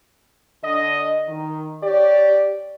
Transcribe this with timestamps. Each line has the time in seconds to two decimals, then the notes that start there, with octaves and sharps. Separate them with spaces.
0.63 D3 D4 D#5
1.27 D#3
1.83 G4 C#5 D5